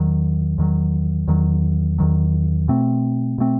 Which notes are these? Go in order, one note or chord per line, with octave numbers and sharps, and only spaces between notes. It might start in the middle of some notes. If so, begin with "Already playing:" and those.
Already playing: E2 D#3 F#3
E2 D#3 F#3
E2 D#3 F#3
E2 D#3 F#3
B2 A3 C4
B2 A3 C4